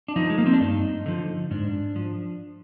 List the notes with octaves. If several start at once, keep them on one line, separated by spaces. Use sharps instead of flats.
D4
F3 D#4
G#3
A#3
C4
D4
G2 D#4
D3 F3
G#2 D4
F3